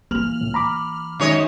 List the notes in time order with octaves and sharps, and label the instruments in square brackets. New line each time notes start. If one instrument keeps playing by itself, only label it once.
[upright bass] E3 A#3 [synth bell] F6 F7 F#7
[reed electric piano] C#2 A2
A#5 B5 D6
[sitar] F#2 C#5 D#5 [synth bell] D#3 G#3 D#4